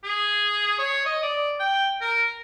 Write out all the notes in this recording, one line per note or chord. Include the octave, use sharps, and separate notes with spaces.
G#4
C#5
D#5
D5
G5
A#4